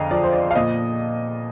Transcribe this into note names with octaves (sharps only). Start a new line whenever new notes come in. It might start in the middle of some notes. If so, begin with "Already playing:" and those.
Already playing: F2 D3 D#5 F5 A#5
F3 D5
C5
D5
F5
A#2 D#5